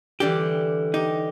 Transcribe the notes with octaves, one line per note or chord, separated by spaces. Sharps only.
D3 E3 G3 G4
D#4 G4